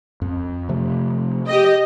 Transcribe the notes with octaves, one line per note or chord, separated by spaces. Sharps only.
F2
C3 F3 A3
G4 D#5